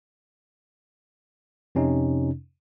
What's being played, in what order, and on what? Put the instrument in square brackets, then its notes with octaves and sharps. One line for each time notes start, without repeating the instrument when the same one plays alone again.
[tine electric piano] F2 C3 C#4 D#4